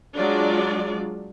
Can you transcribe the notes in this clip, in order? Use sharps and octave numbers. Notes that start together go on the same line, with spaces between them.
F#3 G#3 D4 F4 D5